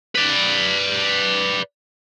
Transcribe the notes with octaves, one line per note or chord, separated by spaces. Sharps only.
B4 D5